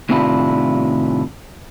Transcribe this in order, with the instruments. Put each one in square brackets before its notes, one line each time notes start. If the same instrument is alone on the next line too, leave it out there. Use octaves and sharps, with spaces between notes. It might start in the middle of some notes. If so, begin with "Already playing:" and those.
[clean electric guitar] A2 C3 D#3 D4 E4 F4